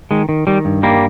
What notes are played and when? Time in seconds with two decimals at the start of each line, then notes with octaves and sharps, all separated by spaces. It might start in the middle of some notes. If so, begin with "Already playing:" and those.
0.11 D#3 G#3
0.29 D#3
0.47 D#3 G3
0.65 G2
0.83 D#3 G3 A#3